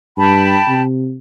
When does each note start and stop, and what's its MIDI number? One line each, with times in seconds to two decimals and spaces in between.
0.18 0.59 43
0.18 0.82 79
0.18 0.82 81
0.18 0.82 83
0.68 1.18 48